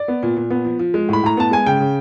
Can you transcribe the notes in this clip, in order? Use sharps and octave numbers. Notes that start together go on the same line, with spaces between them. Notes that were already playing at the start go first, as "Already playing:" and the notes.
Already playing: D5
B3
A#2
A#2
B3
F3
F3
G#3
A2 B5
A2 A#5
B3 A5
G#3 G#5
C#3 G5
C#3